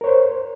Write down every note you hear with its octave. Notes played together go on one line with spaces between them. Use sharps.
A#4 C5 C#5